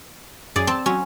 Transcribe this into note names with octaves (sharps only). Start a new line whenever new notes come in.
F#2 G#4 D5
C4 A5
F#3 C#4